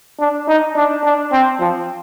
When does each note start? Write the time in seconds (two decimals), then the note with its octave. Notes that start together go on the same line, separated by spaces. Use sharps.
0.19 D4
0.48 D#4
0.76 D4
1.04 D4
1.32 C4
1.60 F3